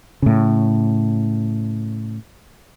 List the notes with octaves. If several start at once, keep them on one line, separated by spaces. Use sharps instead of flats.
A2 C#3